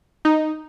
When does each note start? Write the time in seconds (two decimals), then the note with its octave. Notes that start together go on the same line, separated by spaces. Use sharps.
0.25 D#4